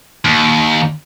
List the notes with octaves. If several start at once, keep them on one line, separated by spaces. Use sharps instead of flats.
D#2